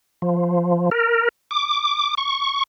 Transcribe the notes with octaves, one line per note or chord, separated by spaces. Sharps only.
F3
A#4
D6
C#6